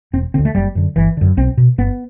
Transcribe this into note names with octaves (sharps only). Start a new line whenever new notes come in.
E1 C4
D2 D3 C4
A3
F#1 G3
F#2 D3
G1 E3
F#2 D3
B1 C4
B2
G1 B3